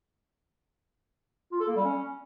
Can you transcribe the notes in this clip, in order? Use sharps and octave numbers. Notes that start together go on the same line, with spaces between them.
F4
A4
A#3
G3
C#4